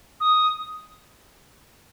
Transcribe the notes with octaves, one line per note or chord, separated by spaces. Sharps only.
D#6